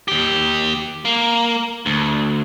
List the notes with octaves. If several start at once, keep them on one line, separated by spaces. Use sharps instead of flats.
D#2 G4
A#3
D2